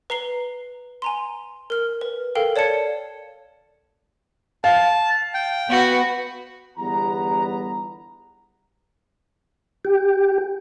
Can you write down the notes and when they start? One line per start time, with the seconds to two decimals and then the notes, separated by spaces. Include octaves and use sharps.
0.10 B4 A#5 C7 G7
1.02 G#5 A#5 C6
1.70 A#4 F6
2.01 B4
2.35 A4 A#4 F5 G5
2.56 C#5 D5 A5 G#6 C#7
4.64 F5 A5
5.34 G5
5.67 B3 F#4 B4
6.77 G1 E2 G3 B3 A#5
9.85 G4